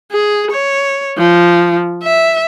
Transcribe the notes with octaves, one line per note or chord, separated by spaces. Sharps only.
G#4
C#5
F3
E5